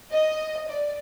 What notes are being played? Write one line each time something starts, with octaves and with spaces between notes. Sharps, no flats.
D#5
D5